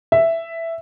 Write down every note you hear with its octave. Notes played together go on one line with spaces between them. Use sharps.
E5